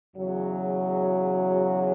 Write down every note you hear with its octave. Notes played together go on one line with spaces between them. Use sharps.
E2 C#3 F#3